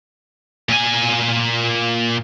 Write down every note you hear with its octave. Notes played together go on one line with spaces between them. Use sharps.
A#2 G#5